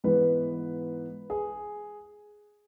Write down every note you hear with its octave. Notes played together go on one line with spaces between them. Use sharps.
G#2 E3 G#3 B3 B4
G#4